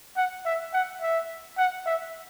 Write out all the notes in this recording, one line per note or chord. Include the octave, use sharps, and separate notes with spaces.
F#5
E5
F#5
E5
F#5
E5